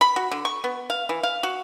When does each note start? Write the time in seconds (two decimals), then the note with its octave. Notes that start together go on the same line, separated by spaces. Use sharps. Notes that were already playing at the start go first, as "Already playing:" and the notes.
0.01 B5
0.16 F#4
0.31 D3
0.45 C#6
0.64 B3
0.90 F5
1.09 E3
1.23 F5
1.43 F#4